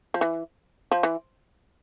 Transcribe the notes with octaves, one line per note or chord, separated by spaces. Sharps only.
F3
E3
F3
E3